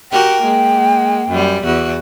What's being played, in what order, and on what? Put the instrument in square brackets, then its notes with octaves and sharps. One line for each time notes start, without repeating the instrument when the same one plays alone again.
[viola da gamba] F#4 G4 A#4 [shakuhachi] G5
[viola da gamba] G#3 A#3
F#2 G3
E2 F#4